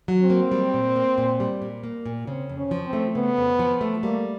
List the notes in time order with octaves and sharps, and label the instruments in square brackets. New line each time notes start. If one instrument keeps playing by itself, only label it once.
[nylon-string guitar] F#3
[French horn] C4
[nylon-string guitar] A#3
G3
A#2
A#3
A#2
G3
A#2
A#3
A#2
[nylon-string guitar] C#3 [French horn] C4
[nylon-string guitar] F2
[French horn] C#4
[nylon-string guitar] F3
[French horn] C4
[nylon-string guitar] A3
[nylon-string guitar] C#3 [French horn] B3
[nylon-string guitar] F2
F3
A3
[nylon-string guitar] G3 [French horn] A#3